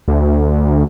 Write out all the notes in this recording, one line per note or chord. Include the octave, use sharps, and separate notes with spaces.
D2